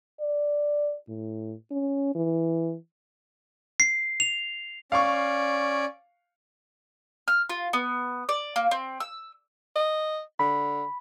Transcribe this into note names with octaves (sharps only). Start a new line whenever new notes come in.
D5
A2
C#4
E3
C7
F7
C#4 D5 F5 C#6
F6
F4
B3
D5
A#3
C4
E6
D#5
D3 B5